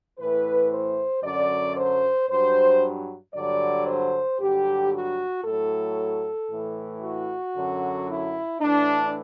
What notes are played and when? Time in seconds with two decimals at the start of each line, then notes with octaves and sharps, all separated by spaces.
0.19 A2 E3 B4
0.71 C5
1.23 F#2 D3 F#3 D5
1.76 C5
2.29 G2 F#3 C5
3.34 G2 D3 F#3 D5
3.87 C5
4.40 G2 D3 F#3 G4
4.93 F#4
5.44 A2 F#3 A4
6.50 A2 E3
7.03 F#4
7.56 F#2 D3 F#3
8.08 E4
8.61 A2 E3 D4